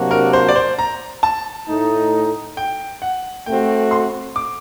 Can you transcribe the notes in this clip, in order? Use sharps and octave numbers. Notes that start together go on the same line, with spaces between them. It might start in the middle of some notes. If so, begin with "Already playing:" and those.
Already playing: C3 F#3 A#3 D4 F#4
A#4
C5
D5
C5
A#5
A5
A2 A3 D#4
G5
F#5
A3 C4 F#4 G5
C6
D6